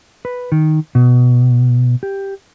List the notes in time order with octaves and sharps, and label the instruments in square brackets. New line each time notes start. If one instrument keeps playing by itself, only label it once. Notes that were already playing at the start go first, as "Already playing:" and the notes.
[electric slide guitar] B4
D#3
B2
G4